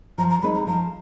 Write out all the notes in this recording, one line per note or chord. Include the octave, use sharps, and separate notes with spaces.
F3 A#5
A#5
G#3 C4 D#4 B5
A#5
F3 A#5